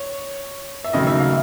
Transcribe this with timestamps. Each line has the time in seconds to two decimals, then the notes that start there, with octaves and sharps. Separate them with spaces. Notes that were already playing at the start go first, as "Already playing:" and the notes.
Already playing: C#5
0.84 E5
0.93 D#2 C#3 F#3 A3 D#5
1.07 E5
1.20 F5